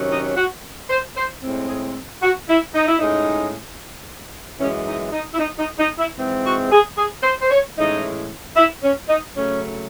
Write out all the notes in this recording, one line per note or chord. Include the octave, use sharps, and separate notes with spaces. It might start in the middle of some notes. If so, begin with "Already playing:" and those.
Already playing: C3 D#3 F#3 C#4
D#4
F#4
C5
C5
A2 G#3 C4
G#4
F#4
E4
D#4
E4
A2 G#3 C#4 D#4
F#2 E3 G#3 C#4
D#4
D#4
E4
D#4
D#4
D#4
E4
G#2 E3 G#3 C4
F#4
G#4
G#4
C5
C5
C#5
A2 E3 G#3 C#4 D#4
E4
C#4
D#4
C#3 F#3 A3 C#4